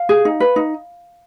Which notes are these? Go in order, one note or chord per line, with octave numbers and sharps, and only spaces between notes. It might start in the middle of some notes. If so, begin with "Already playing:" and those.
Already playing: F5
G#4
D#4
B4
D#4